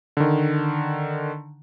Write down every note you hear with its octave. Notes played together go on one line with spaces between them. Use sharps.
D3 D#3